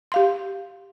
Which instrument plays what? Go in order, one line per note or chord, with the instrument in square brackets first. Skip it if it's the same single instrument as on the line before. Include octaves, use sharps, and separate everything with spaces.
[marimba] G4 F5 C6